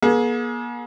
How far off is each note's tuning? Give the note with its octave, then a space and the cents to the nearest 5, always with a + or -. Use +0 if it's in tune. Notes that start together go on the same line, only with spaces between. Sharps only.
A#3 +45 G#4 +30